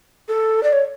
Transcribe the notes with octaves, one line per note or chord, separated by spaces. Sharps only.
A4
D5
C#5